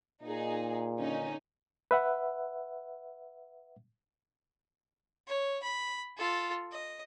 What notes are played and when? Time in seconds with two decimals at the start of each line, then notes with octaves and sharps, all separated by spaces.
0.23 A#2 D#4 G#4
0.99 D3 C#4 D#4
1.91 B4 E5 F#5
5.27 C#5
5.63 B5
6.17 F4 A4
6.72 D#5